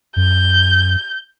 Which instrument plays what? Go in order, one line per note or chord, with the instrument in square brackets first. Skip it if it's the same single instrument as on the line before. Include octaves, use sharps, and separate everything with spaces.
[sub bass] F#2 [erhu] G6